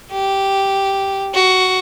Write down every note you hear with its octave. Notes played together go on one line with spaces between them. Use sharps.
G4
F#4